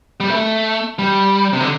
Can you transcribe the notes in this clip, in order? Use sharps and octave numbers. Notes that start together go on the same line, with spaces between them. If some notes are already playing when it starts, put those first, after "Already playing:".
G3
A3
G3
C3
D3